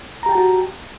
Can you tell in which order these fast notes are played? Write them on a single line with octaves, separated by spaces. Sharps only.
A#5 G4 G5 A5 F#4